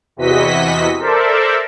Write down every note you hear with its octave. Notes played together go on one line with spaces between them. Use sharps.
E2 C3 E3 F#4 D#5 B6
A4 A#4 C5 D5 E5